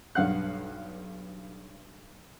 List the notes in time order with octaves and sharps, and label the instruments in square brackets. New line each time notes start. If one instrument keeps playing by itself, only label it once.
[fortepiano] B1 G2 F5 F#5 F#6